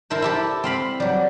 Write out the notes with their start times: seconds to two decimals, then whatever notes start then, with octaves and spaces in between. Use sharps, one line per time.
0.10 E4 A4 A#4 C5
0.22 E4 G4 A4
0.64 C4 F5 B5
1.00 F#3 G3